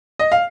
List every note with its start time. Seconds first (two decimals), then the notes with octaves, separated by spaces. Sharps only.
0.19 D#5
0.32 F5